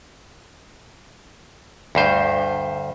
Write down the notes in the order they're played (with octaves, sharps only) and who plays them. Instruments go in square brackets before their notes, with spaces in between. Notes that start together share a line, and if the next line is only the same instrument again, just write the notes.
[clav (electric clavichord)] D2 G2 C5